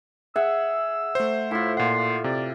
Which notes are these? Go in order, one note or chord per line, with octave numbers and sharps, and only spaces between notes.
G#4 E5 F#5 E6
A3 C5
A2 E4 F4
A#2 F#5 C6
C3 D5